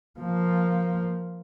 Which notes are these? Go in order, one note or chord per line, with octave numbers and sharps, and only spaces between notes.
F3 A#3